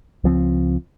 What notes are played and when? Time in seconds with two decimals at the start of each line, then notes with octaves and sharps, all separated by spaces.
0.24 C#2 F3 C4